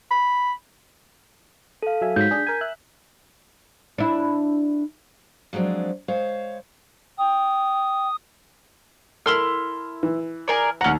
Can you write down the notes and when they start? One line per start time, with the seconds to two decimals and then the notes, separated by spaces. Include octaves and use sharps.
0.11 B5
1.83 A4 F5
2.01 F#3 E5 G#5
2.16 G#2 F#3 G6 B6
2.31 D4 G#4
2.47 A#4 G#5
2.61 E5 F#6
3.98 D4 E4
5.53 F3 F#3 G#3 C4 D4
6.08 G#3 C5 C#5 F5
7.19 G5 D#6
9.26 E4 A4 A#4 C6 F6
10.03 E3
10.48 G#4 A#4 D5
10.81 D#2 C#4 F#5 A#5